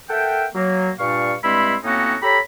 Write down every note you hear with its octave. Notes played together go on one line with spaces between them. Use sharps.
A4 A#4 E5 F#5 G5
F#3 A#3
G2 A#2 D4 F5 C#6
G2 G#3 C4 E4 B5 C6
A2 A#3 C4 C#4 D#4 F#4
G4 A4 C#5 A#5 B5